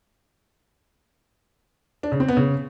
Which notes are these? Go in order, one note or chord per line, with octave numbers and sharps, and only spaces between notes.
D4
C#3
C4
B3
C#3